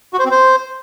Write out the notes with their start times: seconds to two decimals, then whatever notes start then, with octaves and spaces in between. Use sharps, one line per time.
0.13 F#4
0.19 C5
0.25 C4
0.31 C5